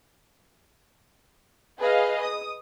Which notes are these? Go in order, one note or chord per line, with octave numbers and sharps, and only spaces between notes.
G#4 B4 D#5 F5
D#6